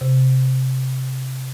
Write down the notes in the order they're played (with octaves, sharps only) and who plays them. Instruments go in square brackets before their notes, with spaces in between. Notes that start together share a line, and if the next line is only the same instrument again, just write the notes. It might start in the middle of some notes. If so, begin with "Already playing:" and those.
[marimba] C3